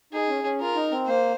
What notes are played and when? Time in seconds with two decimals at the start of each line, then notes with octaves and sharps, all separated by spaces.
0.13 D#4 G#4
0.28 C#4
0.44 C#4
0.60 F4 A#4
0.75 D#4
0.92 C4
1.07 A#3 C5